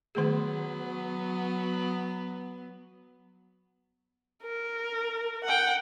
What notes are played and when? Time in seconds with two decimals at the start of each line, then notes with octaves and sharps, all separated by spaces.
0.15 D#3 F#3 A3 B3 G#4
4.43 A#4
5.44 F#5 G5